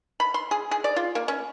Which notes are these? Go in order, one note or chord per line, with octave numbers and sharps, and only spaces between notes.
B5
C6
G#4
G#4
D5
F4
A#3
C#4